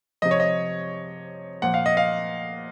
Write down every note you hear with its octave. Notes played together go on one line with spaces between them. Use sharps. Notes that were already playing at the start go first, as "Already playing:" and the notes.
C3 F3 D#5
C#5
D#5
A#2 F3 F#5
F5
D#5
F5